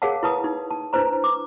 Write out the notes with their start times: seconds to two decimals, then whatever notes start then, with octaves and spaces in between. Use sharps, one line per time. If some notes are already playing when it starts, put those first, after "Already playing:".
0.02 G#4 A#4 C#5 F5 F#5 A5
0.23 E4 B4 A5 D#6
0.44 D#4
0.71 A5
0.93 D4 E4 B4 C5 A#5
1.24 D6